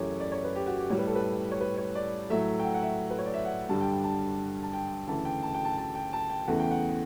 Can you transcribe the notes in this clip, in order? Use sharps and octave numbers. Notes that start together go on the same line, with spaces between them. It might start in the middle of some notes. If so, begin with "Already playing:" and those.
Already playing: F#2 C#3 E3 A3 G4 C#5
D5
C#5
B4
G4
F#4
G4
A2 G3 C#5
B4
A4
B4
C#5
B4
C#5
D5
A2 F#3 A3 E5
G5
F#5
F#5
E5
B4
C#5
D5
E5
F#5
G2 D3 G3 A5
G5
G5
A5
A5
G5
D2 C#3 E3 A5
G5
A5
G5
A5
A5
G5
A5
G5
E2 C#3 E3 A3 F#5
G5
F#5